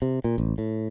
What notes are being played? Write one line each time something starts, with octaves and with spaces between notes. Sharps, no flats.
C3
A#2
A1
A2